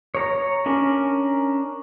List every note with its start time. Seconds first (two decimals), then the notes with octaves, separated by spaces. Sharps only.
0.15 C#5 A#5
0.66 C#4 D4 A#4